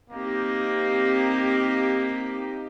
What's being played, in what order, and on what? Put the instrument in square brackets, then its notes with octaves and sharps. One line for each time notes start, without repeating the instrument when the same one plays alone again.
[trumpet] A#3 [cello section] C4 D#4 G4